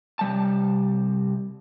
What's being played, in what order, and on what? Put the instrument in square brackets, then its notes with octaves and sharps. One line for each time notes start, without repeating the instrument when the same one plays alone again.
[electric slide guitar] C3 G3 A5